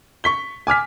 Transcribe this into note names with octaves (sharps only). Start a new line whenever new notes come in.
C#6 B6 G7
G#5 D6 F6 B6